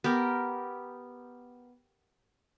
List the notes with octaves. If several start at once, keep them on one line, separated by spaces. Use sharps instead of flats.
B3 G4 A#4